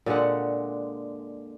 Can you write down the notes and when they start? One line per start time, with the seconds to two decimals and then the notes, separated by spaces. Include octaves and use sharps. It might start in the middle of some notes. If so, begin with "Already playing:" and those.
0.06 A#2 D3 G#3 F#5